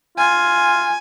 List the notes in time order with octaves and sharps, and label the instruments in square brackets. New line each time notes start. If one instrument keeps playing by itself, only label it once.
[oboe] F4 [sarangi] G#5